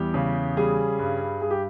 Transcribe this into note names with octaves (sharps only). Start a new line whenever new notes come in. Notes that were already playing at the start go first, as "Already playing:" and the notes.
Already playing: E2 G3 G4
C#3
G3 G#4
G2
G2 G#4
G4